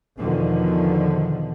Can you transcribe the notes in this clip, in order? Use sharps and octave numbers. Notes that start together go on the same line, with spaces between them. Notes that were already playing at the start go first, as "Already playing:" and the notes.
E2 B2 D3 D#3 F3